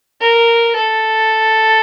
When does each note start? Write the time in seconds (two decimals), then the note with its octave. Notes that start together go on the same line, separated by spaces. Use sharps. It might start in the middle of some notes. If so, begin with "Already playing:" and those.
0.20 A#4
0.75 A4